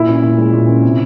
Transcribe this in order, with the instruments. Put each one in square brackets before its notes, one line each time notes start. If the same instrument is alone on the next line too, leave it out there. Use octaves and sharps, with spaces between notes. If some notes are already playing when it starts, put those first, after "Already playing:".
Already playing: [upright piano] A#2 [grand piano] E4
[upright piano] C#4
A#2
G#3
A#2
C#4
C3